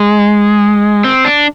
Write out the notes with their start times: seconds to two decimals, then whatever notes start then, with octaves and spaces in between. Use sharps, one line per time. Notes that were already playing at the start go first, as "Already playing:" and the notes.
Already playing: G#3
1.04 C4
1.25 D4